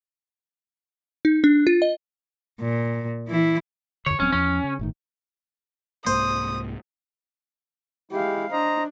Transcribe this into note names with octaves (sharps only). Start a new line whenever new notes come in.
D#4
D4
F4
D#5
A#2
E3 E4
F2 D3 C#5
D#1 F#3 C4 C#4
E2 F3 C#4
C#3
G1 A2 D#3
C2 G#2 A#3 C5 D#6
G#3 E4 G4 F5
D4 C5 D#5 A#5